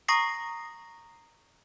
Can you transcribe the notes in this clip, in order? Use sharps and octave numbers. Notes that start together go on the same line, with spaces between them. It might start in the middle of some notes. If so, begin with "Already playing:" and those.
A#5 C#6 D#6 A#6 C7